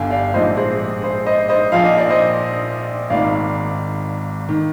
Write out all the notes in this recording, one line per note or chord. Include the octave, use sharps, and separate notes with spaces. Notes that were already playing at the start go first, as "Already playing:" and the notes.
Already playing: G1 G2 D3 F5 G5 G#5
D5 F5
A#1 G#2 F3 C5 D#5
G#4 C5
G#4 C5
C5 D#5
C5 D#5
A#1 A#2 F3 F5
D#5
D5
C5 D#5
G#1 G#2 D#3 D5 F5
D#3